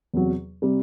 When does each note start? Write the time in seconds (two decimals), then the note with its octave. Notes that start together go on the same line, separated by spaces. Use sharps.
0.14 E2 C3 F#3
0.62 C3 G3